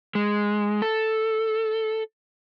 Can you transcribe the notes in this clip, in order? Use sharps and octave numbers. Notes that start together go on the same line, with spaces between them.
G#3
A4